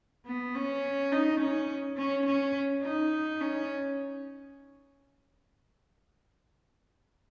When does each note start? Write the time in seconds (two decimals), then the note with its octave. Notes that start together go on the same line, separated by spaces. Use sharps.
0.26 B3
0.55 C#4
1.12 D#4
1.41 C#4
1.97 C#4
2.26 C#4
2.83 D#4
3.41 C#4